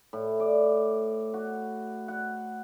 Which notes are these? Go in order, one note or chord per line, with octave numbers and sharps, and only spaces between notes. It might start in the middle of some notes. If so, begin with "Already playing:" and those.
A2
D5
F#4
F#5